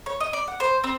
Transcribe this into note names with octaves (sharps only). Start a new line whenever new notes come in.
C#5
D#5
D5
F#5
C5
C4